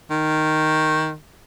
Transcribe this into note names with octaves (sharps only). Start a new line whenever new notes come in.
D#3